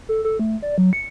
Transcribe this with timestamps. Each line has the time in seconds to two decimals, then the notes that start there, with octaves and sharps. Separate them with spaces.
0.09 A4
0.24 A4
0.39 A3
0.62 D5
0.78 F#3
0.93 C#7